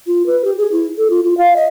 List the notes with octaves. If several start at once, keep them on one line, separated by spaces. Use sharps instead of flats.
F4
B4
G4
G#4
E4
A4
F4
F4
F5
D#5